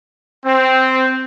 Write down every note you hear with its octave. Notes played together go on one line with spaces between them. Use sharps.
C4